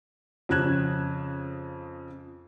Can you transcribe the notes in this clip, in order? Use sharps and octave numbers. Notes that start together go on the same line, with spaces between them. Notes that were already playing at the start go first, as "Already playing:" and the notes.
F2 C#3 C#4 F#6 G#6 E7